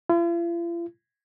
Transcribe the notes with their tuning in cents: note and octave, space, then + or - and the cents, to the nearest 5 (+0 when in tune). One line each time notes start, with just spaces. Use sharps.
F4 -45